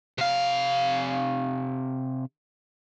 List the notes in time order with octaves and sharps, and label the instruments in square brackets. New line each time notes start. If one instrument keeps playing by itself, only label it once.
[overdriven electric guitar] C3 F5